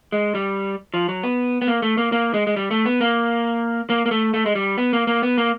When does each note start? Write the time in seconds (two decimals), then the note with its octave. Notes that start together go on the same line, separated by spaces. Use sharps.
0.12 G#3
0.35 G3
0.94 F3
1.09 F#3
1.23 B3
1.62 B3
1.67 A#3
1.82 A3
1.97 A#3
2.12 A#3
2.34 G#3
2.47 G#3
2.56 G3
2.71 A3
2.85 B3
3.01 A#3
3.90 A#3
4.06 A#3
4.11 A3
4.34 A3
4.46 G#3
4.55 G3
4.78 B3
4.93 A#3
5.07 A#3
5.23 B3
5.38 A#3